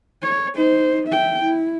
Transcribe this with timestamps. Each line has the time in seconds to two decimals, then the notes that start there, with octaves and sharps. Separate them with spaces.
0.22 C#5
0.55 D#4 C5
1.07 E5 G5
1.43 E4